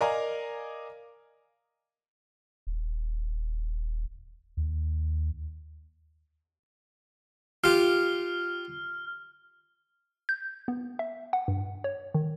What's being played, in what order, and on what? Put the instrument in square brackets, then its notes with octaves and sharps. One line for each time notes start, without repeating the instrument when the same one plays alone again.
[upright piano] A#4 D5 D#5 F5 G#5 A#5
[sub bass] D#1
D#2
[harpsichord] F4 G4 [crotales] F6
[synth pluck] G6
B3
E5
F#5
G2
C#5
D#3